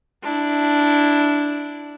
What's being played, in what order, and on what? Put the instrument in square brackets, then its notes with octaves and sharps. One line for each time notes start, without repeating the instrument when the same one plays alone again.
[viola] D4 E4